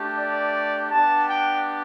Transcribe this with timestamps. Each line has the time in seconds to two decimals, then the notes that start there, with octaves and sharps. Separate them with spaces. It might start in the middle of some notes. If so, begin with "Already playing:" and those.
Already playing: A3 D4 G4
0.16 D5
0.91 B3 D4 G4 A5
1.29 G5